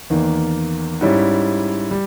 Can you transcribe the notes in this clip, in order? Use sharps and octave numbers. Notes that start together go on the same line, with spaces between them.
E2 D#3 A#3
G#2 G3 C#4 E4
G3